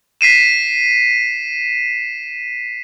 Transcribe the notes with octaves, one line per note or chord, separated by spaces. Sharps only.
B6 C7 D#7 E7